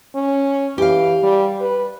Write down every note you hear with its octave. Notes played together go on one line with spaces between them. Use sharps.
C#4
E3 G4 F5
G3
B4